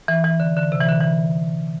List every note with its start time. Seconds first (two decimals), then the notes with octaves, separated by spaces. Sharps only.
0.08 E3
0.24 E3
0.40 D3
0.56 D3
0.72 C3
0.80 E3
0.89 D3
1.00 E3